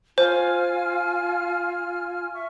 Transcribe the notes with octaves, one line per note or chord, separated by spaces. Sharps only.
F4 C5 G#5 F6
E5 C#6